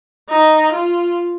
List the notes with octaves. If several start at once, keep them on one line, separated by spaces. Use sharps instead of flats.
D#4
F4